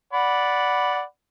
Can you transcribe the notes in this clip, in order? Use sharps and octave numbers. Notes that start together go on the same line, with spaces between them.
D5 F#5 B5